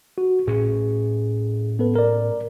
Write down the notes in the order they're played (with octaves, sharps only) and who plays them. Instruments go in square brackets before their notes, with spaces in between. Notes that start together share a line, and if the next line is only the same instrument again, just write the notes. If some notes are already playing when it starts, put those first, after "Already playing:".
[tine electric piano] F#4
[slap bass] A2 C#4 [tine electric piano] G#4
[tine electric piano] B3 A4 B4
A#4 D5